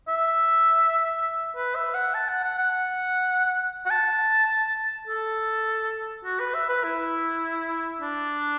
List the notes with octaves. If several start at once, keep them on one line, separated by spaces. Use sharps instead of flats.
E5
B4
E5
F#5
A5
F#5
F#5
F#5
F#5
A5
A4
F#4
B4
E5
B4
E4
D4